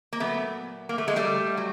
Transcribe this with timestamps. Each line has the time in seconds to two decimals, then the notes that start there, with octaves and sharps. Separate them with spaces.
0.13 A#3
0.20 A#2 F#3 A3 B3
0.89 A#3
0.98 A3
1.08 G#3
1.16 G3 A3
1.57 F#3